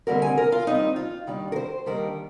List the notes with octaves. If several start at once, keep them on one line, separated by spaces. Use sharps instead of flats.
D#2 D3 G3 C4 A#4
G#5
A#4
F4
D#2 D3 G3 C4 D#4
F4
D#2 D#3 G3 D4
A#4
C5
D#2 D#3 G3 D4 A#4